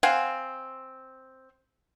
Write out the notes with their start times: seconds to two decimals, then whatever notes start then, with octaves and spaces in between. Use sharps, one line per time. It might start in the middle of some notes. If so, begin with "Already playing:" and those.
0.03 C4 F5 F#5 G#5